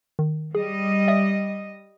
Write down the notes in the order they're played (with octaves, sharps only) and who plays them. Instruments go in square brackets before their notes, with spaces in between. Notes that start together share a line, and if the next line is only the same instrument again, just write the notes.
[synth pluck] D#3
[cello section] G3 D#5 [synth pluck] G#4
[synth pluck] D5 E5 D#6